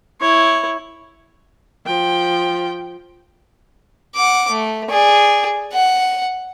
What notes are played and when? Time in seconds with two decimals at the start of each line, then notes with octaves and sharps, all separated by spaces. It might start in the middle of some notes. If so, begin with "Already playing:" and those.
0.21 E4 C#5
1.86 F3 G5
4.16 F#5 D6
4.51 A3
4.90 G#4 D5
5.73 F#5